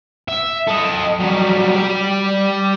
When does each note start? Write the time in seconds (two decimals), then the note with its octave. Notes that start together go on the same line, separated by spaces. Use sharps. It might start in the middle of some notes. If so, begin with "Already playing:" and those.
0.29 E5
0.68 A4 D#5
1.20 F#3 G3
1.76 G4 D5